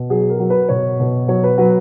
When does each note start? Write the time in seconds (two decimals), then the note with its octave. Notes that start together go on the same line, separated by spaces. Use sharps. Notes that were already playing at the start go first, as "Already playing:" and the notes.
Already playing: B2
0.10 F#3 G#4
0.30 A#4
0.40 F#3
0.50 B4
0.69 B2 C#5
1.00 B2
1.28 F#3 C#5
1.44 B4
1.58 F#3 B4